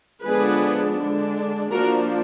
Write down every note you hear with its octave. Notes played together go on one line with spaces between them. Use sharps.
D3 F3 G#3 B3 D4 G#4 B4
D3 G#3 D4
F3 A#3 D4 F#4 A#4